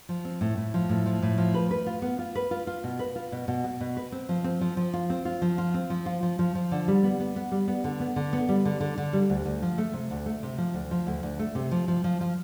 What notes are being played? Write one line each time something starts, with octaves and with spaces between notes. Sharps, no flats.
F3
C4
A2
A2
F3
A2
F3
A2
F3
B4
B4
F4
B3
F4
B4
F4
F4
B2
B4
F4
B2
B2
B3
B2
B4
C4
F3
C4
F3
F3
F4
C4
F4
F3
F4
C4
F3
F4
F3
F3
F3
D3
G3
B3
B3
B3
G3
B3
D3
B3
D3
B3
G3
D3
D3
D3
G3
D2
D2
F3
A3
C3
D2
A3
C3
F3
D2
F3
D2
D2
A3
C3
F3
F3
F3
F3